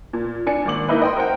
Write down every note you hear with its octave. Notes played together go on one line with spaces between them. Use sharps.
A#2
D4 G#5 C#7
G#1 A#3 D6 F#7
A#3 D#4 E4 B4
D#5 G5 C6
A#4 C5 F#5 G5